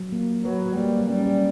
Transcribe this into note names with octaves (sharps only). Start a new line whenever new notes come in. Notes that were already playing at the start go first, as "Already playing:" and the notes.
Already playing: F#3
A#3
F#3 B4
G3 A#3
G3 C#4